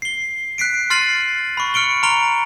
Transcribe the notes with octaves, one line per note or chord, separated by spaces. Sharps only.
C7 G7
F#6 B6 C7 D7
C6 F6 A6 C7 D#7 F#7
B5 C#6
F6 C#7 D7 G7
A#5 C6 F6 D7 F7 G7